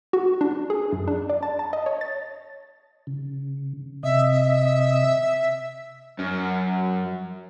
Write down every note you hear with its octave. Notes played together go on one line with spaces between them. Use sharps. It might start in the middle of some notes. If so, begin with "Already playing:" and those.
F#4
D4
G#4
F#2
D4
D5
A5
A5
D#5
C#5
A6
C#3
C3 D#5 E5
E5
F#2